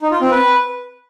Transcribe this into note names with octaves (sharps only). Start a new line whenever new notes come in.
D#4
F4
C4
B4